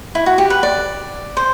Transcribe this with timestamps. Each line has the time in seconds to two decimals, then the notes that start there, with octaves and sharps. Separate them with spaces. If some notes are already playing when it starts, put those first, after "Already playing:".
0.15 E4
0.26 F#4
0.38 G4
0.50 B4
0.63 D5
1.37 C5